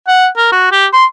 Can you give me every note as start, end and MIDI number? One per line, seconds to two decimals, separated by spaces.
0.08 0.27 78
0.37 0.49 70
0.52 0.69 66
0.72 0.86 67
0.93 1.05 84